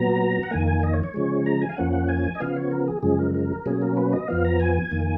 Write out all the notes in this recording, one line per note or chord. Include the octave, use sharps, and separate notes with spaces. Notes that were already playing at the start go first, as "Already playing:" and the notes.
Already playing: A#2 F#3 B3 A#5
F#5
F2 D#3 A#3 G#5
G#5
D#5
C#5
C#5
C#3 F3 G#3
A#5
G#5
F5
F2 F3 A#3 C#4 F#5
F#5
G#5
D#5
C#3 F3 B3 F5
C#5
A#4
G#4
F#2 C#3 F3 G#3 G#4
A#4
A#4
B2 F#3 A#3 C#4 G#4
A#4
B4
D#5
F2 F3 B3 F5
A#5
G#5
F2 D#3 A#3